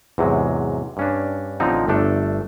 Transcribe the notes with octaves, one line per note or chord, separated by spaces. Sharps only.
E2 G#2 C3 F#3
G2 C#4 D4
A1 D3 F3 C4 D#4
G1 A3 D4 A4